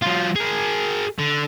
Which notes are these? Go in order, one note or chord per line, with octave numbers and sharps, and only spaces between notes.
F#3 F4
G#4 A#4
D3